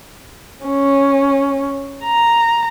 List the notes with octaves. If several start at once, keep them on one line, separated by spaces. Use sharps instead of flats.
C#4
A#5